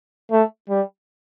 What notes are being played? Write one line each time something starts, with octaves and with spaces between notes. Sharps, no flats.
A3
G3